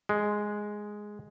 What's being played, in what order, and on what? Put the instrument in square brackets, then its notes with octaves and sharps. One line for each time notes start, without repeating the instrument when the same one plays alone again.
[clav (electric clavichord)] G#3